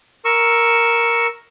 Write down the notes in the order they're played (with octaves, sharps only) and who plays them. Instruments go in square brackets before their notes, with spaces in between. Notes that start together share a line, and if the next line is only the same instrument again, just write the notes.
[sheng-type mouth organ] A#4 C#6 E6